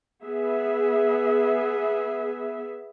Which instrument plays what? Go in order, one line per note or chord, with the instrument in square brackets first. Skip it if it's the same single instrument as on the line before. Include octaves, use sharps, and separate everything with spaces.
[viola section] B3 G#4 E5